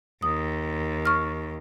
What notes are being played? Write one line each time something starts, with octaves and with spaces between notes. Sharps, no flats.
D#2 D#6
C#6 F6